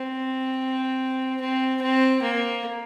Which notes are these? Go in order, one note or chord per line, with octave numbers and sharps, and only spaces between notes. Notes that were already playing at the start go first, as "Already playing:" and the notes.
Already playing: C4
C4
C4
A#3